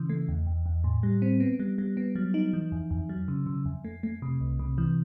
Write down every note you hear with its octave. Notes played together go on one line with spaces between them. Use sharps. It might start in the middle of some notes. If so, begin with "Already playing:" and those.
Already playing: C#3 E3
A3
E2
E2
E2
A2
G3
C4
B3
G3
G3
B3
F#3
D#4
E3
F2
F2
F#3
C#3
C#3
F2
A3
A3
C3
C2
C3
E3